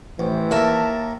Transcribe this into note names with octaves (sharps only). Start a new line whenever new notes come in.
A1 E3 C5
D#2 A#4 E5 A5